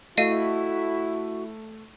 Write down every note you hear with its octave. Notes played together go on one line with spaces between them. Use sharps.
A3 E4 F#4 D#5 F5 D#7